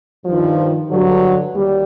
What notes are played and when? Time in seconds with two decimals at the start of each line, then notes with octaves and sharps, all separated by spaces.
0.25 G2 D#3 F3
0.90 G2 D3 F#3
1.55 D#2 G3